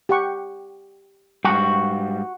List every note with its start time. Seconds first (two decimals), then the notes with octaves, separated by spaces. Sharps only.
0.09 G4 F#5 C#6
1.45 G#2 G3 F#4